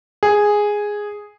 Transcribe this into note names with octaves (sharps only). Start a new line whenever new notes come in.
G#4